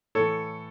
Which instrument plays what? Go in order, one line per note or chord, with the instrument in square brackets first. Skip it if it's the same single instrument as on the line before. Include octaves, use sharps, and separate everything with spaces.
[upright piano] A2 E3 A4 C#5